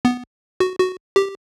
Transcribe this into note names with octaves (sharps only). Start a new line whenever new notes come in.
B3
F#4
F#4
G4